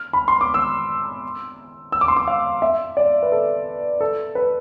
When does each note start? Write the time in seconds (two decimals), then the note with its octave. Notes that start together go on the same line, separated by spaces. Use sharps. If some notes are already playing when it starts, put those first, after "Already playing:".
Already playing: F6
0.13 B5
0.28 C6
0.41 D6
0.54 E6
1.92 E6
2.01 D6
2.08 C6
2.17 D6
2.28 F5
2.62 E5
2.97 D5
3.23 B4
3.32 A4
4.01 A4
4.35 B4